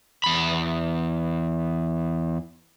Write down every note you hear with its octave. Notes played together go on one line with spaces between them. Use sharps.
E2 B5